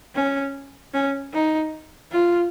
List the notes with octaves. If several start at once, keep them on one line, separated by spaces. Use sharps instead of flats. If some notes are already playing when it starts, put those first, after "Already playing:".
C#4
C#4
D#4
F4